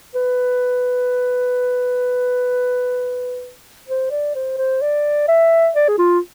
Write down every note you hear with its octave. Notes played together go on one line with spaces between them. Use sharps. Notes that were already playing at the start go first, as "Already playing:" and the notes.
B4
C5
D5
C5
C5
D5
E5
D5
G#4
F4